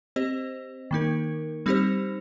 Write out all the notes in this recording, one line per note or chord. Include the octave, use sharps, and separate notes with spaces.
C4 G4 C5 D#5
D#3 A#3 D#4 A#4
G3 C4 D#4 G4 C5